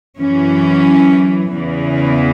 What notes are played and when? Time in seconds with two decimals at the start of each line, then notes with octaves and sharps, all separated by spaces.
0.19 F#2 E3 C#4
1.52 E2 C#3 E3